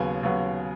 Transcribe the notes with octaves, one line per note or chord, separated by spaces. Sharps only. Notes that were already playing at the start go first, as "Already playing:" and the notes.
Already playing: D#2 C#3 F#3 B3 G#5
D#2 C#3 F#3 B3